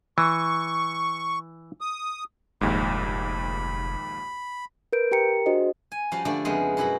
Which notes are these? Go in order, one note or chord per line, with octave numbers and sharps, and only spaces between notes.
E3 C#6
D#6
F1 A#1 D#2 G#2 B5
A#4 B4 G6 D7
G4 A#4 G5 A#5 C#7
D4 F#4 G#4 C5 D#5
G#5
F3 G3 C#4 F#4 G4 F5
D3 F3 G3 A3 D4 D5
F2 C#3 G#3 B3 C6
F#2 B2 E4 F#4 B5